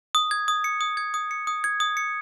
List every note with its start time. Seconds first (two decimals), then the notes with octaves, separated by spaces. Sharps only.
0.15 D#6
0.31 G#6
0.48 D#6
0.64 C#7
0.81 D#6
0.97 G#6
1.14 D#6
1.31 C#7
1.47 D#6
1.64 G#6
1.80 D#6
1.97 C#7